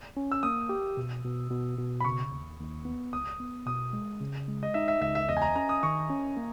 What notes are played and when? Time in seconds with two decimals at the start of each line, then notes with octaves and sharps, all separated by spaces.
0.17 C#4
0.32 E6
0.43 A#3 D#6
0.69 G4
0.97 B2
1.24 B2
1.51 B2
1.78 B2
2.00 B5
2.05 C#3 C#6
2.31 D#2
2.59 D#2
2.85 B3
3.13 C#2 D#6
3.40 B3
3.66 B2 D#6
3.93 G#3
4.20 C#3
4.48 G#3
4.63 D#5
4.74 D#4 E5
4.88 E5
5.01 C#2 E5
5.15 E5
5.29 E2 D#5
5.37 G#5
5.42 A#5
5.55 C#4 A#5
5.69 D#6
5.83 D#3 C#6
6.10 C#4
6.37 A#3